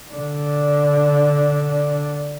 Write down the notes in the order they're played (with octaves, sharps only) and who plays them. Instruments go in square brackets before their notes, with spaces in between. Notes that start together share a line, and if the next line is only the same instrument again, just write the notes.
[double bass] D3 D4